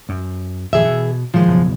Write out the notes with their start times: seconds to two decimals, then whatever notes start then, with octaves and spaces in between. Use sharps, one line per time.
0.09 F#2
0.73 D#1 A#1 G2 E3 G#4 E5
0.84 B2
1.34 A2 D#3 F3 G#3
1.48 F#1 B1 E2